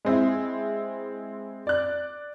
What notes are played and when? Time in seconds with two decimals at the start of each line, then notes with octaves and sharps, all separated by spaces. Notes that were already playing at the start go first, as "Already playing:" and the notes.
0.05 G#3 C4 E4
1.67 D5 F#6